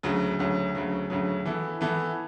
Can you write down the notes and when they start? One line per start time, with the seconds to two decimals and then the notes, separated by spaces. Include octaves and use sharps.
0.03 D2 C#3 F#3
0.39 D2 C#3 F#3
0.75 D2 C#3 F#3
1.10 D2 C#3 F#3
1.45 E3 B3 E4 A4
1.81 E3 B3 E4 A4